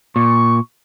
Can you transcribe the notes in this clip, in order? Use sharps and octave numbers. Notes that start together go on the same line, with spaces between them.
A#2 C#6